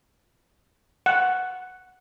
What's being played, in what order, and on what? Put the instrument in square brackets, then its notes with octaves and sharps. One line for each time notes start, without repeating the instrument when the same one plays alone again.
[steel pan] F#5